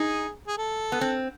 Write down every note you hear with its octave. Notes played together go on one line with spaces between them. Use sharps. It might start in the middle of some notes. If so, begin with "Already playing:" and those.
Already playing: D#4 G#4
G#4
A4
B3
C4